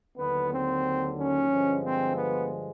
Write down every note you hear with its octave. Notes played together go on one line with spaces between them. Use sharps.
D#2 D3 F#3 B3
C4
C#4
G2 D3 F3 G#3
C4
B3